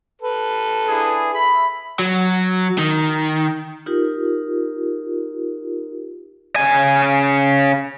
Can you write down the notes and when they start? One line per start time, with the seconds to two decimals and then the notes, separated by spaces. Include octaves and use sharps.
0.22 A4 B4
0.87 D4 E4 G#4
1.34 E5 B5
1.99 F#3
2.78 D#3
3.86 D#4 F4 G4 A#4
6.56 C#3 G#5